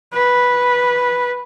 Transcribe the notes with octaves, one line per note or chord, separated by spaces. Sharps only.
B4